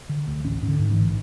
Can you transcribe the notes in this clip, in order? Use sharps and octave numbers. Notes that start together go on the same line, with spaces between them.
D3
D2
A1 C#4
G#2
D3
G#2
E3
A1